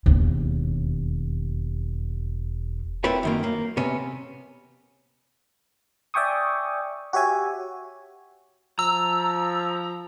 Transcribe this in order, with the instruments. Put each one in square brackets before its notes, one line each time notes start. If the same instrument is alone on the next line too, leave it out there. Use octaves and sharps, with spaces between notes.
[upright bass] E1 D#2
[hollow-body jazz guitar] C4 E4 F4 A#4 B4 C#5
F#2 D#3 A#3
A#3
C3 B3 C#4
[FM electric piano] D5 E5 G5 G#5 C#6 D#6
F#4 G4 C#5 E5 G#5
[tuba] F3 [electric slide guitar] A#5 [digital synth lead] E6